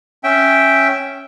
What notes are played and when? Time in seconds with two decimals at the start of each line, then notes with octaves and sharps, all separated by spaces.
0.24 C#4 E5 G5